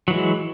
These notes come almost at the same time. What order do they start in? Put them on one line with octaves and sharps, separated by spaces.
F#3 E3 G#3